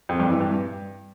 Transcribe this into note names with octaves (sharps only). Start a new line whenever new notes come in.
F2
G2
E3
G2
G2